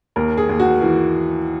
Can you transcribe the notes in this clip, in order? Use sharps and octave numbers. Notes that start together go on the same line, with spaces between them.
D#2 A#4
G#4
D#2
F#4
E3